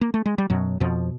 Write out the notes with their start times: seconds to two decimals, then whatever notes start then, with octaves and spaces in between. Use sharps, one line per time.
0.01 A#3
0.14 A3
0.26 G#3
0.38 G3
0.50 F#2 B2 F#3
0.80 F2 B2 F3